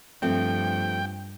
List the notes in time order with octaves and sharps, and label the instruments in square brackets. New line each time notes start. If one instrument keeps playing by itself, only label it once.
[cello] G2 [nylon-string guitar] F3 A3 C4 [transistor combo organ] G5